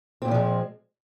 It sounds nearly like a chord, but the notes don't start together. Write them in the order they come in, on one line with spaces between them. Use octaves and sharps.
C4 A#2 D3 F3 G#3